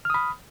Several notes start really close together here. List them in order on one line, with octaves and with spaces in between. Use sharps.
F6 D#6 B5